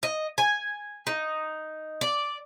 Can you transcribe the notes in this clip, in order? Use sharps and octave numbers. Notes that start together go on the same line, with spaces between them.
D#5
G#5
D#4
D5